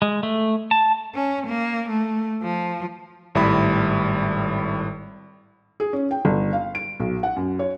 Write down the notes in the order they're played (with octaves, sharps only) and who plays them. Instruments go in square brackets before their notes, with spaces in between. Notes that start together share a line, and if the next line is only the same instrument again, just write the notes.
[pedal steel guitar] G#3
A3
A5
[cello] C#4
A#3
A3
F3
[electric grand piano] G#1 A2 G3 D5 E5 B5
[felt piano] G#4
C#4
G5
G1
F5
D7
B1
F#5
F#2
C#5